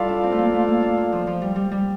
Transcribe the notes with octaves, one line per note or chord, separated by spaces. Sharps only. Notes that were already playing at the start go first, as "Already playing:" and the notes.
Already playing: G3 E4 F4 A4 D5 F5
D4
C4
A3
A#3
A3
A#3
D4
A#3
F3
F3
G3
G3
G3